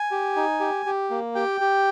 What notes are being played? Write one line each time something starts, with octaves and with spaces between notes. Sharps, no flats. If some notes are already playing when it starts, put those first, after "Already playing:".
Already playing: G#5
G4
D#4
G4
G4
A#3
G4 G5
G4